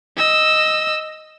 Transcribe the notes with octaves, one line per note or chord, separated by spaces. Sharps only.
D#5 E6